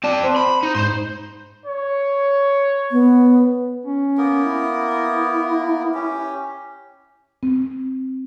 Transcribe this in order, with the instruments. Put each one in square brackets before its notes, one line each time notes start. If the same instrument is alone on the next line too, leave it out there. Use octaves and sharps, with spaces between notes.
[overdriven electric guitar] C4 A5 [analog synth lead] D5
[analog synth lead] C5
[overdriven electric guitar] B5
D#4
[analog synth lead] G#2 [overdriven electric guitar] C5 C6
[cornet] C#5
[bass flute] B3
[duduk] C#4
[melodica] A#3 B3 A#4
[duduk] E4
[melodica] C#4 G4
[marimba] C4